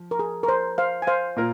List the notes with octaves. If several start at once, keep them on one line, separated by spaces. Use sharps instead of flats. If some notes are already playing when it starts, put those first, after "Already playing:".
Already playing: F3
A#4
G#4
A#4
C5
C5 F5
G#5
C5 F5
A#2 A#3 F4 A#4